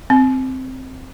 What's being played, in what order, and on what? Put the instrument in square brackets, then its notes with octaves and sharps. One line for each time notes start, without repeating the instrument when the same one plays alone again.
[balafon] C4